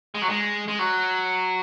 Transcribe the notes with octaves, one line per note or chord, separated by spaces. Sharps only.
G#3
F#3
G#3
G#3
F#3